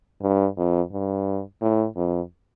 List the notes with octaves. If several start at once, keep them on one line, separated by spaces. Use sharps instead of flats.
G2
F2
G2
A2
F2